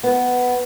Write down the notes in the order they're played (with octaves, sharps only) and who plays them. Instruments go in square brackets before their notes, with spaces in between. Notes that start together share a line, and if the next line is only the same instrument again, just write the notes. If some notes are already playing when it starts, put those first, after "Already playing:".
[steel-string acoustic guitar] B3